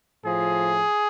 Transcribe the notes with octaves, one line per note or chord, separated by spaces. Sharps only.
A2 F3 G#4